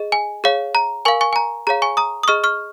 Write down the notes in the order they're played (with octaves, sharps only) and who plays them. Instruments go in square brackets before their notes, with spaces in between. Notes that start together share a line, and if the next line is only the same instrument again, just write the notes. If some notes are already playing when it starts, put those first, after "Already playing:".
Already playing: [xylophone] G#4 D#5
G#5
G#4 C#5 F5
A#5
A#4 F5 G#5 C#6
G#5 C#6
G#5
A#5
G#4 C#5 F5 A#5
G#5 C#6
A#5 D#6
D#6
G#4 D#5 C#6 F6
C#6 F6